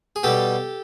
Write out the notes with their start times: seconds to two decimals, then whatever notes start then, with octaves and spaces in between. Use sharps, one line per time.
0.16 G#4
0.23 B2 G3 G4 A4